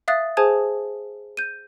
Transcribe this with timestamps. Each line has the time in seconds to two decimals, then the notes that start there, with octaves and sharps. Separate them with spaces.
0.08 E5 F5 D#6 F#6 A6
0.37 G#4 C5 G#5 A5 D#6 G#6
1.37 G6 D#7